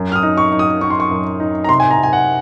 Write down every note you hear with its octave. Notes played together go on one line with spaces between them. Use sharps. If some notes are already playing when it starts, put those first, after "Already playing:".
Already playing: F#2
F6
D#6
D#4
C#6
D#4
D#6
D#4 C#6
C6
C#6
F#2
D#4
A#5
C3 C6
G#5
A#5
C3
G#5
F#5